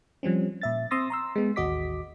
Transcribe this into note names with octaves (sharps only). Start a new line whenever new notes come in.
F3 G3 C4 C#4
A#2 E5 A6
C4 C6 D#6 E6 A6 A#6
A#5 C6 E6
G#3 B3
A1 D#2 F#4 D#5 D6 B6